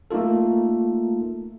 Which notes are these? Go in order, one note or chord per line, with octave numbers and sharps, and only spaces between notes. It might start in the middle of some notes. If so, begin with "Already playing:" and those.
A3 A#3 D#4 F4 A4